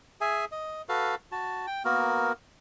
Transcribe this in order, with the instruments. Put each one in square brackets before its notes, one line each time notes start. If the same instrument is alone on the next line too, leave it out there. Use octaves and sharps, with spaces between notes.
[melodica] G#4 E5 G#5
D#5
F#4 A4 B4 F5
F#4 A5
G5
A#3 B3 F#4 A#4